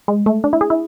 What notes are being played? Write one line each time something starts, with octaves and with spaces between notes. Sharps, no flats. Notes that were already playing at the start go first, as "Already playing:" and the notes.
G#3
A3
D4
E4
G#4
E4